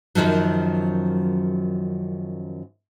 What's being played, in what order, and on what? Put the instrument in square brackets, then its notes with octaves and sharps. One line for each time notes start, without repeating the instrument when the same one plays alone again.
[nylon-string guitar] F#2 C3 D#3 F3 F#3